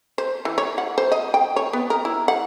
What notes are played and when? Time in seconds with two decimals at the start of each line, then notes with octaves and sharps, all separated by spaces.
0.18 C5
0.45 E3
0.58 C#5
0.78 F#5
0.98 C5
1.12 D#5
1.34 G5
1.56 C#5
1.73 B3
1.90 A#4
2.05 E4
2.28 F#5